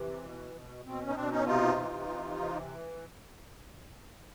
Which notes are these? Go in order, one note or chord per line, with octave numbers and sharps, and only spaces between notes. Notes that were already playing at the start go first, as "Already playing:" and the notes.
Already playing: C3 E3
B2
B2
B2 C4
C#4
D#4
B2 C4 D4
C#4 D#4
C3 D#4 F4
E3
C3
E3